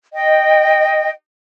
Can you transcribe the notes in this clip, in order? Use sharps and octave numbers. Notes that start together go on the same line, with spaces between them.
D#5 G5